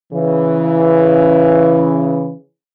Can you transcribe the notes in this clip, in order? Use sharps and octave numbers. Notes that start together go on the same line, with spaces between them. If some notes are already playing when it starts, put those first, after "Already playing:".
C#3 E3